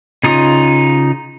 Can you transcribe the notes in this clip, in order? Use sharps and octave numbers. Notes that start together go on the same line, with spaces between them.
C#3 D#4 F4 D#6